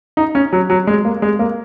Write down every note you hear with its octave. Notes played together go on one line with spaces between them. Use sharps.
D#4
C#4
F#3
F#3
G#3
A#3
G#3
A#3